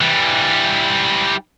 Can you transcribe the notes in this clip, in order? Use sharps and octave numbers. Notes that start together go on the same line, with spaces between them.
E3 G3